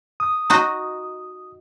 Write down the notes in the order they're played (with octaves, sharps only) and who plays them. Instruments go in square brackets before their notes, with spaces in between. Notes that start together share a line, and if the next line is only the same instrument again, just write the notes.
[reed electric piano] D#6
[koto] D#4 F#4 D#5